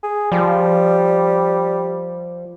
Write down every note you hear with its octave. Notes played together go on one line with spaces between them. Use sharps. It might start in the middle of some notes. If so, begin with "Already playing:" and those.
G#4
F3 G3